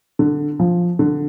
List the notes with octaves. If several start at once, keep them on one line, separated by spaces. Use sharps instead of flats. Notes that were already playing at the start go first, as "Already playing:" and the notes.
D3
F3
D3